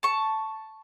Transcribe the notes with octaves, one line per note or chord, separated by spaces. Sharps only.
A5 C#6